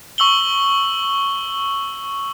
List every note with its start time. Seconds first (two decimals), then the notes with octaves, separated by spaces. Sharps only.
0.18 C#6 E6 F#7 G7